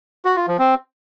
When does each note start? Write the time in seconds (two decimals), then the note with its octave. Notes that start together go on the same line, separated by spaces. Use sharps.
0.25 F#4
0.36 F4
0.48 F3
0.59 C4